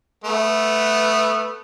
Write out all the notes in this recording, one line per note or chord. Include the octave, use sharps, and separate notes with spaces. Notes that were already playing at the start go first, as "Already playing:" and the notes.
A3 B3